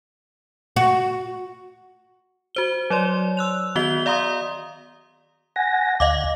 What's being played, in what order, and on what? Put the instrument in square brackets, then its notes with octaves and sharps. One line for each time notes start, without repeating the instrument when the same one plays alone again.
[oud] F#4
[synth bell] F#4 C5 G7
F#3 C#5 D5 C6
E6 F#6 F7
D#3 B3 F#4 D#5 B6 G7
D5 F5 A#5 C6 D#6
[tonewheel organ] F#5 G#5 A#6
[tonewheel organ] D2 [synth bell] D#5 F5 D6